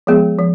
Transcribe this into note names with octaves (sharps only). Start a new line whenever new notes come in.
F3 G#3 B3 G#4
F3